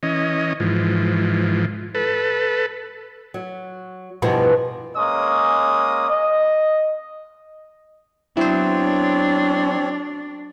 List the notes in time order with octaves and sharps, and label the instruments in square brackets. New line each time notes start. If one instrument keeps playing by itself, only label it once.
[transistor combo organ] E3 C#4 D#5
G#2 E3 F3
A4 B4
[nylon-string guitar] F#3
E2 G2 B2 F3 B3
[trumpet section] G#3 A#3 C#4 D#5 D#6
D#5
[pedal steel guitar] F#3 B3 [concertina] C4 C#5 [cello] D4 [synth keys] E4 C5